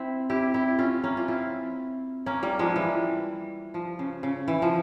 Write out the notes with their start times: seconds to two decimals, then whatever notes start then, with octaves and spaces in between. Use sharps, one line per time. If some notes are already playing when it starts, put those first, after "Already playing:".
Already playing: C4 E4
0.30 E4 G4
0.54 E4 G4
0.79 C#4 F4
1.04 A#3 C#4
1.17 F4
1.28 C4 E4
2.26 A#3 C#4
2.43 G3 A#3
2.59 F3 G#3
2.76 E3 G3
3.74 F3
3.99 C#3
4.23 C#3
4.48 E3
4.62 F3